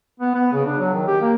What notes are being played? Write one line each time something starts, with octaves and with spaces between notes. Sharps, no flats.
B3
B3
C#3
D4
F#3
D#3
G4
A#3